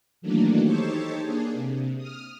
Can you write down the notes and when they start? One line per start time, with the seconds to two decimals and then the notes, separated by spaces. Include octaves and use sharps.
0.21 D#3 E3 F#3 A3 A#3 D4
0.63 D#4 G4 A4 C5 C#5 A5
1.22 A#3 D4 G#4
1.54 C3
1.97 D#6 F6